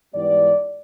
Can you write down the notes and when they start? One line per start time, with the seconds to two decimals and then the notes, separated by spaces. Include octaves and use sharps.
0.13 G#2 E3 G3 B3 D5